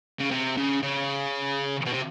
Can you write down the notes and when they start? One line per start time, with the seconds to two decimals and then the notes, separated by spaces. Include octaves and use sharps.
0.20 C#3
0.31 C3
0.57 C#3
0.82 C#3
1.86 B2
1.93 C3